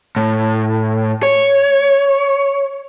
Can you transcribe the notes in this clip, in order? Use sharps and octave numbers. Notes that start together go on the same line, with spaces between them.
A2
C#5